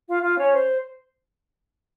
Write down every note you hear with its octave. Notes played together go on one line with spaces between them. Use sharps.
F4 F5
F4 F5
C#4 C#5
C5